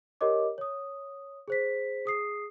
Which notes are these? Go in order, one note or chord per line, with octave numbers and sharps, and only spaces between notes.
G4 A#4 C#5 D#5 D6
C#5 D#6
G#4 C5 B6
G#4 D#6 C7